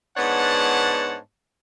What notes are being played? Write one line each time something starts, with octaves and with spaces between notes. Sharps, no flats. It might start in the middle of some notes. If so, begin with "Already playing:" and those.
G#2 B3 D4 C#5 F#5 A5